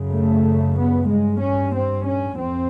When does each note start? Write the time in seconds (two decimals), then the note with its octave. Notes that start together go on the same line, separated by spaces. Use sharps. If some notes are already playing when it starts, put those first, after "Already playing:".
Already playing: F#2 C#3
0.12 A3
0.77 B3
1.09 G2 G#3
1.42 C#4
1.74 C4
2.06 C#4
2.38 F2 C4